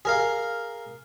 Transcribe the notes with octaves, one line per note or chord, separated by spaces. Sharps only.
G#4 A#4 F5